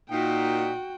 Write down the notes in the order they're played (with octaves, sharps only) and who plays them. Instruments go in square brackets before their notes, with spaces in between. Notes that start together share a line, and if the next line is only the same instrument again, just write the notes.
[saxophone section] A#2 D#4 [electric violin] F#4 G5